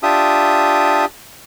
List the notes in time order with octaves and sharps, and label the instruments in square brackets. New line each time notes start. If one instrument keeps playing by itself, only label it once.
[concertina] D4 F4 G4 E5 D#6